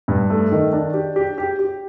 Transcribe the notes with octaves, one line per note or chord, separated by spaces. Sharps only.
G2
A3
D#3
D4
G4
G4
G4
G4